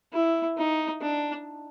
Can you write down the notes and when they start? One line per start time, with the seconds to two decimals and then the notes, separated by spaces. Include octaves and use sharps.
0.13 E4
0.57 D#4
1.01 D4